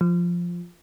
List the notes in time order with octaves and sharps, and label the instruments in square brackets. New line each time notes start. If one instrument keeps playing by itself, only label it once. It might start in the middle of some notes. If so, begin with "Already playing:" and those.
[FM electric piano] F3